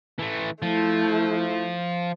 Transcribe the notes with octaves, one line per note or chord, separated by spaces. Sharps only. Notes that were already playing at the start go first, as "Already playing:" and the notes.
E3 A3
F3 A3 E4